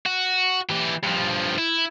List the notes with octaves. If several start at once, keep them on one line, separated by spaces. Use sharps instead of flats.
F#4
E3 G4
G2 F3
E4